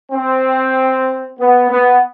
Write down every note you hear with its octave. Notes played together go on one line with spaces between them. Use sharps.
C4
B3
B3